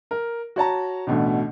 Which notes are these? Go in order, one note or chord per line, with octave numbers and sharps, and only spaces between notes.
A#4
F#4 C#5 A5 A#5
A1 D2 B2 D3 A3